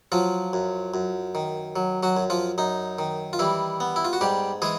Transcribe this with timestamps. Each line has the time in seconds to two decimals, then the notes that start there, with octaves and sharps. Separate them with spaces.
0.12 F3 F#3 F4
0.53 F#2
0.94 F#2
1.35 D#3
1.76 F#3
2.03 F#3 F#4
2.17 F#2
2.30 F3 F4
2.58 F#2 D#4
2.99 D#3
3.33 F4
3.39 E3 G3 E4
3.80 B3
3.96 E4
4.05 F4
4.13 F#4
4.21 G#2 G3 G4
4.62 E3 G#3 G#4